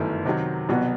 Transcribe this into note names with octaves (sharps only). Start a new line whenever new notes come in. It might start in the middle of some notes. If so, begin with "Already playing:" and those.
Already playing: G1 F#2 D#3 A3 E4
C3 D#3 F#3
C2 B2 F#3 B3 F#4